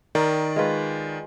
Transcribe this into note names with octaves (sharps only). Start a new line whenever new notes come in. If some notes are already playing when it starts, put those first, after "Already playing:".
D#3 A#4 D5
G#3 F4 B4